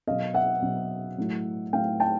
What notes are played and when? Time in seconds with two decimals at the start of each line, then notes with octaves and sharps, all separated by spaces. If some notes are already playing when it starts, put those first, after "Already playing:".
0.07 B2 F#3 D#5 F5
0.34 E5 F#5
0.62 B2 F#3
1.18 A2 F#3
1.73 A2 F#3 F5 G5
2.00 G5 A5